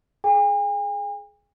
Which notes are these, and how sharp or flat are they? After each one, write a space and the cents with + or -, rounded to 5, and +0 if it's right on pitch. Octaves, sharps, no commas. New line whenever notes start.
G#4 +20 G#5 -45